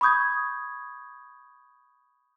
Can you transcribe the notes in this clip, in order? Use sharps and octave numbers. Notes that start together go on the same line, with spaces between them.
B5 C#6 D#6 G6 G#6